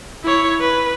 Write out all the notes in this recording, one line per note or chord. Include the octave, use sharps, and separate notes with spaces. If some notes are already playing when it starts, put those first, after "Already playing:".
E4 C#5
B4